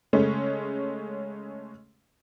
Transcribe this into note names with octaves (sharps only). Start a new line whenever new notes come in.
C#3 G#3 A3 C#4